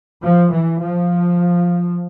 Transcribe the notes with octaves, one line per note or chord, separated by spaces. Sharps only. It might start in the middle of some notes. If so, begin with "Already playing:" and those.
F3
E3
F3